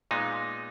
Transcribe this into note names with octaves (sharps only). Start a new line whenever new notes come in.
A#2 G#3 B3 D#4